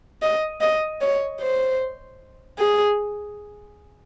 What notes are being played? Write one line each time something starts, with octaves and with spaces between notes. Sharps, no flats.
D#5
D#5
C#5
C5
G#4